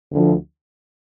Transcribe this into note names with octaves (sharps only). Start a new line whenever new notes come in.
D2 D3 F3